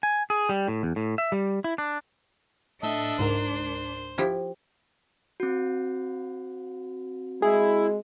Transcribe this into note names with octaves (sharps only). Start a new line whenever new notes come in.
G#5
G#4
G3
A2
E2
A2
E5
G3
E4
D4
A2 D4 A4 D#5 E5
C#2 G#2 A#4 C5
F3 E4 G4
C4 F#4
G#3 E4 G#4